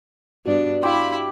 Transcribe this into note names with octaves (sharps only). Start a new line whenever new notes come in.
G2 B3 D4 F#4 D5
E4 F#4 G4 F5 B5 C6